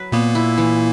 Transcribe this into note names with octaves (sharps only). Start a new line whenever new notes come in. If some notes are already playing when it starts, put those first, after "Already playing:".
Already playing: F#3 B4
A#2 A#3 B3
E4
E3